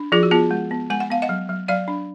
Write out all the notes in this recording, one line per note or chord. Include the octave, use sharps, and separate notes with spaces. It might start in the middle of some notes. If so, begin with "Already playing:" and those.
Already playing: D4
F3 F4 G#4
F#4
B3 F4 G#4
G#3
B3
G#3 G#5
F#5
B3 F5
D#5 F#5
F#3
F#3
F#3 D5 F5
D4